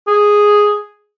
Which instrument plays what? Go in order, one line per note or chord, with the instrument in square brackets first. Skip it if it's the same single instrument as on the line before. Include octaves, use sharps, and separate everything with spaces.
[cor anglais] G#4